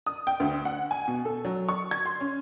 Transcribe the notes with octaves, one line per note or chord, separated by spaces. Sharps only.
D#6
G5
D2
F#5
G#5
B2
A4
F#3
C#6
G#6
C6
C#4